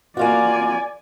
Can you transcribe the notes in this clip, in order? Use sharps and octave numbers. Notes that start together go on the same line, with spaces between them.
A#3 F4 F#4 D5 G#5